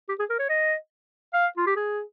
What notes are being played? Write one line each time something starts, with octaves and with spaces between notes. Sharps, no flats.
G4
G#4
A#4
C#5
D#5
F5
F4
G4
G#4